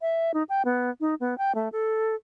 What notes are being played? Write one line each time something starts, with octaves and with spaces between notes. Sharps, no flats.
E5
D#4
G5
B3
D#4
B3
G5
A3
A4